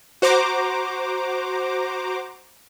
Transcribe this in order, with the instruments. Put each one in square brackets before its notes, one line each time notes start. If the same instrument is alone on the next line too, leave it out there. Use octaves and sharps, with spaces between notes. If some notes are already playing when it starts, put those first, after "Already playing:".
[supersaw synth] F#4 C5 A#5 D6